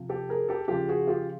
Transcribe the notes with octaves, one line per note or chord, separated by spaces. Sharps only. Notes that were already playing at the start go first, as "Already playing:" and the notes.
Already playing: C3 F3
G4 A4
G#4 A#4
G4 A4
C#3 F3 F4 G4
F#4 G#4
F4 G4